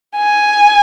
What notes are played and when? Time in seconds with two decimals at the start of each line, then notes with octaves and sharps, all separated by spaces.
0.16 G#5